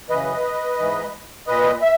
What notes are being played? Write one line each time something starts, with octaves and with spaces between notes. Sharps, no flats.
F#2 C#3 E3 B4 D#5
G#2 E3
A#2 B4 D#5
E5